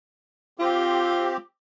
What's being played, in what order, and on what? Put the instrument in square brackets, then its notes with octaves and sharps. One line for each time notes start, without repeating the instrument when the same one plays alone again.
[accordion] C4 G4 [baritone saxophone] F4